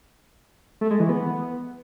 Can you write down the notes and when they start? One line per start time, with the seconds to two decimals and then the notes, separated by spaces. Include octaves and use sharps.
0.81 A3
0.90 G#3
1.00 E3
1.09 B3